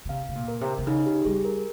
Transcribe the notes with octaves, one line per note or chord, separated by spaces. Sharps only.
C#3
C3 F5
C3
A#2
A#4
C3
C3
C#3 D#4
G4
G3 G#4
A#4